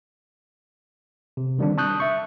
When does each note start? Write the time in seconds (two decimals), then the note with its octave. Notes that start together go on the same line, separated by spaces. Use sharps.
1.37 C3
1.58 D3 D#3 G3 C4 D4
1.78 A5 C#6 D#6 F#6 G6
2.00 E5 C#6